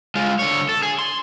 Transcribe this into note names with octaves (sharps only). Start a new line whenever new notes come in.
G#3 F4
D3 C#5
A4
G#4
C6